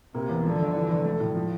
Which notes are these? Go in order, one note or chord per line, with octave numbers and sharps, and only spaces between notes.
C3 A#3
E2
D3 F3
G1
E3
F1
A3
A2
F3